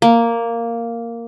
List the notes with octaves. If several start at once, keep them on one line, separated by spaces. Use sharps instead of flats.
A#3